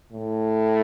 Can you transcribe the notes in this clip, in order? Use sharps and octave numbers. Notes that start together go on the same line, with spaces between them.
A2